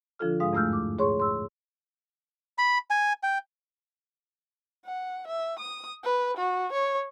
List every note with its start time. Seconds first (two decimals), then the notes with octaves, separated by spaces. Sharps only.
0.19 D3 F3 D4 F4 A4 F6
0.40 G#2 G#3 F5 D#6
0.53 E2 G2 A3 E6 F6 G6
0.73 D6
0.98 A#2 G#4 C#5 C6 C#6
1.20 C6 E6
2.58 B5
2.90 G#5
3.23 G5
4.85 F#5
5.27 E5
5.59 D#6
6.04 B4
6.37 F#4
6.72 C#5